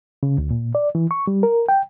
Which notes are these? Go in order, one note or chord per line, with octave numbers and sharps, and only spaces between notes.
C#3
D2
A#2
D5
E3
C#6
G3
A#4
G5